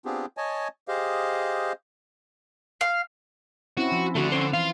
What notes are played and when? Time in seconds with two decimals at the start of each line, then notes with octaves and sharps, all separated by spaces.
0.05 B3 C4 D4 F4 G4 G#4
0.37 C#5 D#5 G#5 A5
0.88 G4 G#4 C5 D#5 F5
2.81 F5
3.77 C4 C#4 E4 F#4
3.92 F3
4.15 D3 A3 F#4
4.32 C#4 C5
4.53 E3 F4 F5